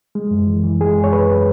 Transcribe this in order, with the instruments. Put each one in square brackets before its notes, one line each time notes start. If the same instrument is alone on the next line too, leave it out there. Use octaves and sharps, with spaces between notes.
[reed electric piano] G#3
F#2
E3
E3
G#3 G#4
F#2
C#5
F#2 B4